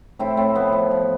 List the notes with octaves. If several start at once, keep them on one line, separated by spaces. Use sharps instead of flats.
A2 C4 E4
A2 C4
F3 B3
F3
F3